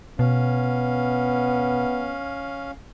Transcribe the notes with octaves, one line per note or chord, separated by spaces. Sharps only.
B2 B3 C#4 F5